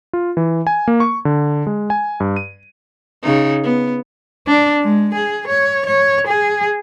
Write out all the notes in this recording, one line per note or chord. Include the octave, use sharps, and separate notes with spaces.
F4
E3
G#5
A#3
C#6
D3
G#3
G#5
G2
D#7
C#3 D#4
B3
D4
G#3
G#4
C#5
C#5
G#4